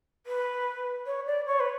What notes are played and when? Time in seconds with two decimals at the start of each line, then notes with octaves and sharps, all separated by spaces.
0.26 B4
1.06 C#5
1.26 D5
1.46 C#5
1.59 B4